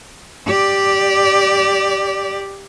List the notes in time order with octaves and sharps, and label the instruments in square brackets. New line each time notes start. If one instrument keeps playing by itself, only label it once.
[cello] G4 D5